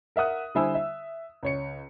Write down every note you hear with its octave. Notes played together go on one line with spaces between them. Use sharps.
A#4 E5 F#5 D#6 F#6
D3 G3 E4 C5 G#5 E6
E5
C#2 C#5 C#7